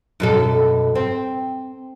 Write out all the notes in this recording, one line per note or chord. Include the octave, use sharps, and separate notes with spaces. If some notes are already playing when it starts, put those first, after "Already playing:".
F#2 B2 A4
C4